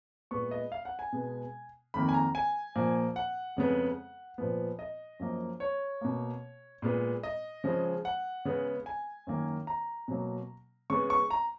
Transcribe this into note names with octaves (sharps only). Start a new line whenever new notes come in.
A#2 G#3 B3 C#6
D#5
F5
F#5
G#5
B2 G#3 B3
F2 D#3 A#3 B5
G#5
A#5
G#5
A#2 F3 A#3
F#5
F2 C#3 G#3 B3
A#2 F3 B3
D#5
F#2 F3 A#3
C#5
B2 A#3
A#2 G#3 B3
D#5
C#3 F3 G#3
F#5
C#3 G#3 B3
G#5
F#2 D#3 A#3
A#5
B2 F#3 A#3
C#3 G#3 B3 C#6
C#6
A#5